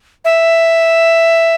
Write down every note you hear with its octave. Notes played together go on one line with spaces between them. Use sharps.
E5